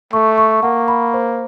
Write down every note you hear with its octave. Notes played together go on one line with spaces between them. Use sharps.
A3 C#6
C#6
A#3 F#5
B5
C5